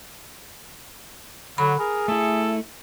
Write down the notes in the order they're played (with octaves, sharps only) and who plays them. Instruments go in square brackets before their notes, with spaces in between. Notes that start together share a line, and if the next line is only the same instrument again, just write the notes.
[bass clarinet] D3 [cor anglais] F#3 [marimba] B5
[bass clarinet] G#4 [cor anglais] A#4
[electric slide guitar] A3 E4 [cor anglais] A4